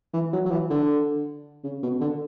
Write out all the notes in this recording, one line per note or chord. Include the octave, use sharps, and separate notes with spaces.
E3
F#3
F#3
E3
D3
C#3
B2
D3